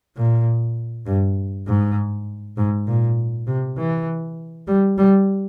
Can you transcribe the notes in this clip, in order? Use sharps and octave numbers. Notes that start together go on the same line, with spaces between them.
A#2
G2
G#2
G#2
A#2
C3
E3
G3
G3